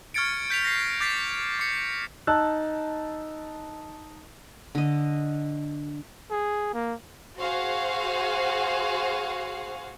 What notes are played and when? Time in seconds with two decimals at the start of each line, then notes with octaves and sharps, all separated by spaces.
0.14 C#6 F6 G#6 A6 C#7 D7
0.50 G6 B6 D7 F7
0.64 A#6 C7
1.01 D6 G6 A6 B6 C7
1.60 D6 C#7
2.27 D#4 A5 E6 F#6
4.75 D3 D#5
6.31 G#4
6.74 A#3
7.38 F#4 G#4 C5 F5